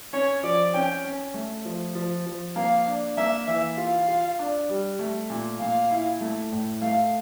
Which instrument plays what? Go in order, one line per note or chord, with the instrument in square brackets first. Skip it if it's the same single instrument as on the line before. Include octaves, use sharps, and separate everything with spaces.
[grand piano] C#4 [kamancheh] C#5
[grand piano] F3 [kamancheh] D5
[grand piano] C#4 [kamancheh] G5
[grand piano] C#4
A3
F3
F3
F3
[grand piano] A#3 [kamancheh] F5
[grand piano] D4
[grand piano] A#3 [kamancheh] E5
[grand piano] E3 [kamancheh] E5
[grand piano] F4 [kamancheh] F5
[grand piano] F4
D4
G3
A3
A#2
[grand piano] A#2 [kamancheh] F5
[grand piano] E4
A3
A2
[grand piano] A3 [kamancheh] F5